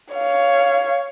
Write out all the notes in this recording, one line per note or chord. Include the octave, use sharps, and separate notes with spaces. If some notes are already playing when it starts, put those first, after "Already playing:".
C#5 F5